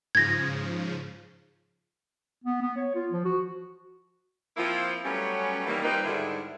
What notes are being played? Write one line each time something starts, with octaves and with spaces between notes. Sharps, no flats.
G#2 C#3 F3 G#6 A#6
B3
B3
C#5
F4
F3
F#4
F3 A#3 C4 E4 F4
F#3 G3 A3 B3 C#4
D#3 E3 G3 A#3
G3 A#3 C4 D#4 F4 B4
G#2 D3 D#3 G3 E4